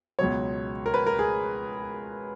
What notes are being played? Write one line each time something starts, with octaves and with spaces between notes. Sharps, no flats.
C#2 B2 F#3 C#5
A#4
B4
A#4
G#4